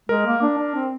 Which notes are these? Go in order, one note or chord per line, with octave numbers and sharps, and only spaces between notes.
G#3 A#4
A#3
D4
D4
C4